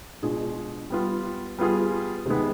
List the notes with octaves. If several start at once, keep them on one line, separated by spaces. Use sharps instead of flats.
B2 G#3 D4 F4 G#4
G3 B3 F4
G3 B3 F4 G#4
C3 D#3 G#3 B3